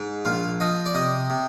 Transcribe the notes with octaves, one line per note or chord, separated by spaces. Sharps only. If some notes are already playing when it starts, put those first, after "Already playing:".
Already playing: G#2
A#1 F4
F3 D#5
D5
C3 D#5
C3